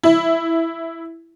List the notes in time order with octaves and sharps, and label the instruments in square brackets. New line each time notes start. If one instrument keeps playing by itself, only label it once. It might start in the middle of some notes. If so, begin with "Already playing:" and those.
[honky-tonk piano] E4